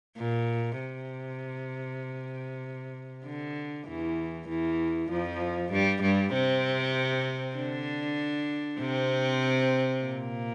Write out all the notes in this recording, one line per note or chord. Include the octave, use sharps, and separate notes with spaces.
A#2
C3
D3
E2 E3
E2 E3
F2 F3
G2 G3
G2 G3
C3 C4
D3 D4
C3 C4
A#2 A#3